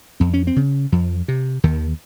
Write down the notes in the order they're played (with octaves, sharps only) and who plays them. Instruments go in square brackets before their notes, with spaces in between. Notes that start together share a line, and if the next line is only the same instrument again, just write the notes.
[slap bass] F2 C4
C#4
C4
C#3
F2 F3
C3
D#2 D#3